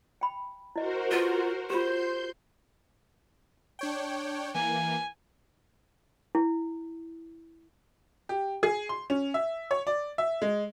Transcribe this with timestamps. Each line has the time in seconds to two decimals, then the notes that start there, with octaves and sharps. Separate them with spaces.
0.21 G5 B5
0.76 E4 F#4 A#4 C5 D#5
1.11 F4 A4 B4
1.70 F4 G4 C5 C6 G6
3.79 D4 C#5 G5
4.55 E3 A#3 G#5
6.35 E4
8.29 G4
8.63 G#4
8.89 C6
9.10 C#4
9.34 E5
9.71 C#5
9.87 D5
10.18 E5
10.42 G#3